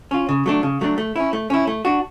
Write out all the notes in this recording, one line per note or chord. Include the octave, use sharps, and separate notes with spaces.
C#4 F4
C#3
F#3 A3 D4
C#3
F#3 A3 D4
A3
C#4 E4
A3
C#4 E4
A3
D4 F#4